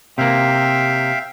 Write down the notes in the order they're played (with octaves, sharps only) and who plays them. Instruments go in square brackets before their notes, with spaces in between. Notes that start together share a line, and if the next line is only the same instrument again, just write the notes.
[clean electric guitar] C3 A#3 [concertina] E5 F5 G5